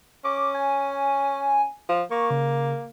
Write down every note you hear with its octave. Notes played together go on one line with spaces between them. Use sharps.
C#4 D6
G#5
F3
A#3 C#6
C#3